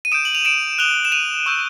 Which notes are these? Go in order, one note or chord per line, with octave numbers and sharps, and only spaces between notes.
D#7
D#6 G6 D7 E7
F#7
F7
D7 E7
D#6 F#6 F7 G7
E7
D#7 F7
C#6 E6 G6